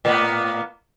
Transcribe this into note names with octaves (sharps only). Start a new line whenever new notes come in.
A2 A#3 B3